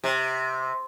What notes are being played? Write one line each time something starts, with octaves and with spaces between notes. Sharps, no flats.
C3